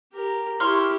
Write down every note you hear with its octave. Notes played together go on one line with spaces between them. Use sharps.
G4 A#4
E4 G4 C6 C#6 F6